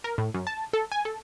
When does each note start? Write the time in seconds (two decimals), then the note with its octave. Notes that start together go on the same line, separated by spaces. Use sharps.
0.04 A#4
0.18 A2
0.34 F#2
0.47 A5
0.73 A4
0.92 G#5
1.05 A4